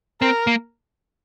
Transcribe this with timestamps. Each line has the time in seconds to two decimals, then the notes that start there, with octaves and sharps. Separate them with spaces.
0.21 C4 A#4
0.47 A#3